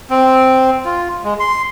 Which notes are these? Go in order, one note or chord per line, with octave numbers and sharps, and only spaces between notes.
C4
F4
G#3
C6